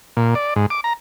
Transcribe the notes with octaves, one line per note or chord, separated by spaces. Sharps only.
A#2
D5
G#2
D6
A#5